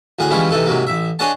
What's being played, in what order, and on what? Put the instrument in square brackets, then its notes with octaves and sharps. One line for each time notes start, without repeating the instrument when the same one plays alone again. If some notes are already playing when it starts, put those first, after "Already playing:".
[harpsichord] D2 A2 G#4 F#5
E3 F3 G3 G#3 C#4 E4
C3 E3 D#4 A4
G#2 C3 F#3 A#3
A1 E5
D4 G#4 C#5 D#5 F#5 A5